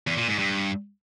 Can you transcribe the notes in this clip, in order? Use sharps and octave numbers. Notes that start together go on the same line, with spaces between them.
E2
A#2
G#2
G2